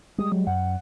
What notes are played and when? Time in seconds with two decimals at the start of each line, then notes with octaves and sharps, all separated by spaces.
0.18 G3 G#3 D#6
0.32 F#3
0.47 F#2 F#5